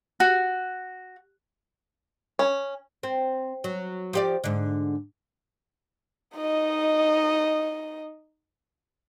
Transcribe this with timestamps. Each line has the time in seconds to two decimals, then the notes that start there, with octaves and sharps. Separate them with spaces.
0.20 F#4
2.39 C#4
3.03 C4
3.64 F#3
4.13 F3 G4 D5
4.44 G#2 D3
6.36 D#4 D#5